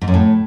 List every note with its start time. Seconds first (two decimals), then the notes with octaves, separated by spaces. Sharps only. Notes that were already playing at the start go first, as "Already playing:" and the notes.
0.01 G#2
0.08 F#2
0.14 A2